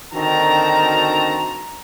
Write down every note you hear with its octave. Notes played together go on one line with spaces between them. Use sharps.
D3 D#3 C4 F#4 A5 A#5